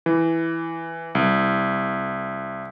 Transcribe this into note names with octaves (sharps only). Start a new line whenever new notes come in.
E3
C2